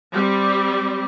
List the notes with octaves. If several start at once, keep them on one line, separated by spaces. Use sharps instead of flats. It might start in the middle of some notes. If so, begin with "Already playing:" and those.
G3 C4